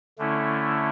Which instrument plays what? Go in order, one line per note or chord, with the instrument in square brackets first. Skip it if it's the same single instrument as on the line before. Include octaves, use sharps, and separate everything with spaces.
[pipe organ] D3 A3 C#4 E4